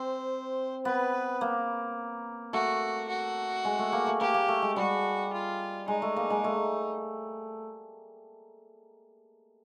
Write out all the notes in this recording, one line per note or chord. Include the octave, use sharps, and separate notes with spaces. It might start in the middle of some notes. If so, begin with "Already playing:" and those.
Already playing: C4 C5
B3 B4
A#3
A3 F#4
F#4
G#3
A3
A#3
A3
A#3 G4
A#3
A3
G#3
G3 F#4
F4
G#3 D#4
A3
A#3
G#3
A3